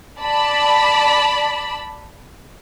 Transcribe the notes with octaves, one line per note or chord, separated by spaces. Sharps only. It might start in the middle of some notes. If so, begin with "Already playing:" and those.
D5 A5 B5